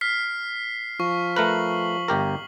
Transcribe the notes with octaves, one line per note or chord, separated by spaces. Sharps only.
F6 B6 C7
F3 C#6
A3 A#4 B4 F#7
G1 G4 A#4